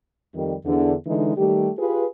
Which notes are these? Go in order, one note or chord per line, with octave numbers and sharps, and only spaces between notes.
F2 D#3 G3
E2 D3
D3 E3 G#3 D#4
D#3 G3 A3 G4
F4 G4 G#4 B4